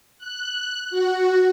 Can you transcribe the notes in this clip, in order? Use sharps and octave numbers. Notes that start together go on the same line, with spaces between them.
F#6
F#4